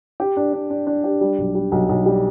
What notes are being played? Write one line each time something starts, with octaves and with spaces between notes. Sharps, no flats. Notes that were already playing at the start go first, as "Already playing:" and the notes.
G4
D4
D4
D4
D4
G4
G3
B1
G3
B1
B1
G3